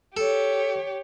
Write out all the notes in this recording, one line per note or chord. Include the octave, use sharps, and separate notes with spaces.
G4 A4 C#5